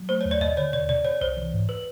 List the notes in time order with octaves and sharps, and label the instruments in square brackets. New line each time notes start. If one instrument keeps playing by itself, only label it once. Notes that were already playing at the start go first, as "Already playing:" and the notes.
Already playing: [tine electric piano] F#3
[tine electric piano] A3 [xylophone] C5
[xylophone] C#5
[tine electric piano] D#2
[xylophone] D5
[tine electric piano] D#2 [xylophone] D#5
[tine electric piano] D3 [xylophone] C#5
[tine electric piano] C3 [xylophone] D5
[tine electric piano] C3 [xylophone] D5
[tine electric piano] C3 [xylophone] C#5
[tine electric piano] C2 [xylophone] C5
[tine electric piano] E3
G#2
[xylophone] B4